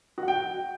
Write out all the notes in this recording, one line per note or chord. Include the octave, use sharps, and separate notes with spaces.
F#4
F#5
G5